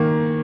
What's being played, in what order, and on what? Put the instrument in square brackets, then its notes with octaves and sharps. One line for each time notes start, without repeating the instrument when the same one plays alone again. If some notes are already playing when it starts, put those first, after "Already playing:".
Already playing: [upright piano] D#3 A#3